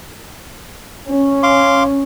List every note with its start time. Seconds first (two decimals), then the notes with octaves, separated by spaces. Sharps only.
1.08 C#4
1.43 F5 C6 D6